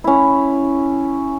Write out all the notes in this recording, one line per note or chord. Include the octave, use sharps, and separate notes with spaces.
C#4 E4